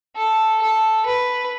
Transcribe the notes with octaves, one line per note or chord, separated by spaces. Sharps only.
A4
A4
B4